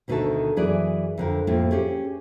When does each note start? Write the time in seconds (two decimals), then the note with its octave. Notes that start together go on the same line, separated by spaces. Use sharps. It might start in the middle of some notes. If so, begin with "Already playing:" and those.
0.08 D2 B2 D#3 G3 A3 A4
0.56 F#2 E3 G#4 D5
1.18 F2 D3 A#4
1.47 F2 A2 A#3 F4
1.71 C#4 G4 G#4 C#5